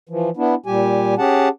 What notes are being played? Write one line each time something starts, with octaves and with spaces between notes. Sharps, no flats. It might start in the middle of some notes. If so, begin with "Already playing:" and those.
E3 F3
B3 D4 E4
A#2 G3 G4 G#5
C#4 G4 G#4 F#5 A5